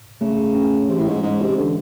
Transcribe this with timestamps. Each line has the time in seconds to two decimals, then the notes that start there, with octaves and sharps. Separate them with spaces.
0.21 C#3 A3
0.55 C#4
0.89 C3 E3
0.99 A2
1.06 G#2
1.23 G#2 G#3
1.41 C3
1.57 D3 E3